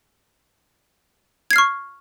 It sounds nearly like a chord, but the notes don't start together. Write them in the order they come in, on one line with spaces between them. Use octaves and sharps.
G#6 C7 F6 C#6